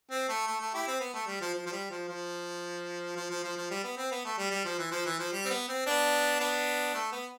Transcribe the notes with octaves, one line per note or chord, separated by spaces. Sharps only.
C4
A3
A3
A3
E4 G4
C4
B3
A3
G3
F3
F3
F3
G3
F3
F3
F3
F3
F3
F3
G3
B3
C4
B3
A3
G3
G3
F3
E3
F3
E3
F3
G3
C4
B3
C4
B3 D4
B3 D4
A3
B3